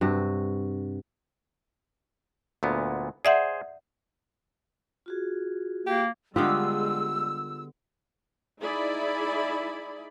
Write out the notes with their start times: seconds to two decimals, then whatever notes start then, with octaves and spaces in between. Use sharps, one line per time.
0.01 G2 C3 F#4
2.63 D2 A#2 B3
3.25 G#4 C5 D5 E5 F#5
5.06 F4 F#4 G#4
5.86 A#3 G4
6.36 D3 G3 G#3 B3 F4 G4 E6
8.61 D#4 E4 G#4 D5 B5